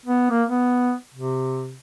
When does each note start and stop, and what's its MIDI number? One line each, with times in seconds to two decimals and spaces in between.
0.06 0.29 59
0.30 0.43 58
0.49 0.93 59
1.14 1.75 48